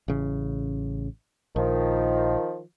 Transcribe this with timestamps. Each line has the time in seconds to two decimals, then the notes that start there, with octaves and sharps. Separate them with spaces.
0.08 A1 C#3
1.56 A#1 D#3 F3